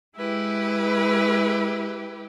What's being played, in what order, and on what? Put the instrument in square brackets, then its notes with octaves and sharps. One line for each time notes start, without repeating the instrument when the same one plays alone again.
[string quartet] G#3 E4 G4 B4